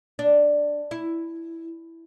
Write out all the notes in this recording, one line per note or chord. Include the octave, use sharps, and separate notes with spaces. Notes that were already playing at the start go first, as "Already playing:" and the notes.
D4
E4